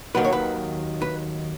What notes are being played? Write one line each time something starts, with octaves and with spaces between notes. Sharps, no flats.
D#2 D#3 F#3 B4
C#5
B4
B4